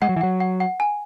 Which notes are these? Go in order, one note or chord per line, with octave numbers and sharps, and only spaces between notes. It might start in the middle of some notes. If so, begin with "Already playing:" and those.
G#3 F#5
F#3
E3
F#3 F#5
F#5
F#5
G#5